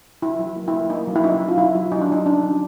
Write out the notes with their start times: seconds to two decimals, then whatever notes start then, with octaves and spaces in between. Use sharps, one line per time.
0.22 F#3 E4
0.39 F#3
0.56 A#3
0.68 E4
0.73 A#3
0.90 A#3 D#4
1.07 F#3
1.16 E4
1.24 C#4 D#4
1.41 F#3
1.48 F4
1.58 F#3 E4
1.75 F#3
1.92 F#3 D#4
2.01 D4
2.09 F#3 D#4
2.26 C#4 D4
2.43 F#3